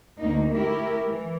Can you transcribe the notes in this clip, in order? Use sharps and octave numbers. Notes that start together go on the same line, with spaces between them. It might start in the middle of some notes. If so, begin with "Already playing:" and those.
D2 A#3 D#4
A3 E4 G4 A#4
E3